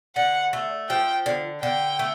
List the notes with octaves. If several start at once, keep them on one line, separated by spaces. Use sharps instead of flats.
D3 F#5
A3
F3 G5
D3
D3 G5
A3